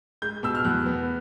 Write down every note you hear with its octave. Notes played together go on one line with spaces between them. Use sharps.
G#3 G6
B2 E6
F6
E2 F#6
B3